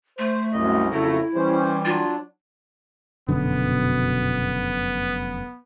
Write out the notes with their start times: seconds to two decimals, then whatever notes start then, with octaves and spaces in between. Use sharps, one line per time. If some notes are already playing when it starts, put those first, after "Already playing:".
0.19 A3 C5
0.53 C2 F#2 D#5
0.92 F2 C#3 F#3 A3 E4 A#5
1.35 E3 G3 C#4 C5
1.85 F#3 D4 F4
3.29 F1 F#2 B2 D3 B3